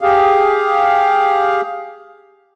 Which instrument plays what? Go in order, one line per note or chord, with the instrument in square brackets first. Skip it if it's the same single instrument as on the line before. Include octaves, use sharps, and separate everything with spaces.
[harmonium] G4 G#4 F5